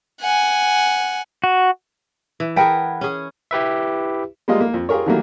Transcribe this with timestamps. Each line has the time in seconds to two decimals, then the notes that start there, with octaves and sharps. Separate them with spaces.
0.21 F#5 G#5
1.44 F#4
2.40 E3
2.56 G#4 A#4 B4 F#5 G5 A5
3.01 C#4 G#4
3.51 E4 G4 B4 E5
4.48 G3 G#3 A#3 F4 D#5
4.61 A#3
4.74 F2
4.89 F4 G4 G#4 A#4 C#5
5.06 D#3 E3 F#3 G3 A3 A#3